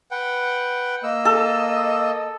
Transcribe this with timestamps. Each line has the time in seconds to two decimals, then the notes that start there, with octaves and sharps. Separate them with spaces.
0.11 B4 F#5 G5
1.03 A#3 D#5 E6
1.25 A4